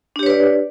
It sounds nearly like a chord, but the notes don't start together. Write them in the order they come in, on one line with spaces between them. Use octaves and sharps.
D4 G4 C#5 B4 D5